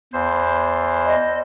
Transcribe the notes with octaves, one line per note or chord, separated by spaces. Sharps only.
E2 C5
D#5